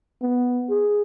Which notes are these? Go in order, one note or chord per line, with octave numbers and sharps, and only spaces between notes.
B3
G#4